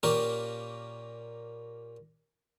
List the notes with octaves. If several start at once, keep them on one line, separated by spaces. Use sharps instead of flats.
A#2 A#3 C#4 G4 A#4